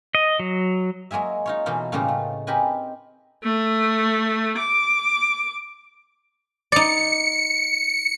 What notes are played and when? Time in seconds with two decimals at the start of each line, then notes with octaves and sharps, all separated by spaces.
0.15 D#5
0.40 F#3
1.11 F#3 G#3 A#3 G#4 E5
1.46 D#4 F4 C#5
1.66 B2 E3 A#3 D#4 F4 A4
1.92 A2 C#3 G3 A#3 D#4 F4
2.08 A3
2.47 C4 D#4 G4 A#4 B4 G#5
3.44 A3
4.58 D6
6.72 D#4 D5 C#7